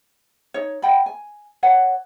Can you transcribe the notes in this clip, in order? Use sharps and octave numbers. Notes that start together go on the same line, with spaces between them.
D#4 C#5
D#5 F#5 G5 B5
G#5
B4 C#5 F#5